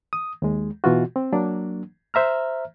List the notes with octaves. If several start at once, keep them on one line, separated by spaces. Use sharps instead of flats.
D#6
D#2 G#3
B2 E3 F4 F#4
C4
F#3 A#3 D4
C5 E5 A#5 F6